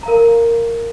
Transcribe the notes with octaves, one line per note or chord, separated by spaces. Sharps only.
A#4 F5 A#5